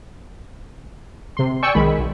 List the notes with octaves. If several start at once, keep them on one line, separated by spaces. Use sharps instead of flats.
C3 C6
D5 G5 G#5 C#6 E6 C#7
B1 D#3 G#3 B5
B1